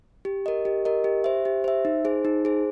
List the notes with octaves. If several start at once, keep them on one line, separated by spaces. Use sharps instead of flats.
G4
A#4 D#5
G4
A#4 D#5
G4
C5 E5
G4
C5 E5
D#4
G#4 C5
D#4
G#4 C5